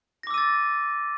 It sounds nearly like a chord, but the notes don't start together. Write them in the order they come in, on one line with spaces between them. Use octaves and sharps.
A#6 D6 E6 D#7 A6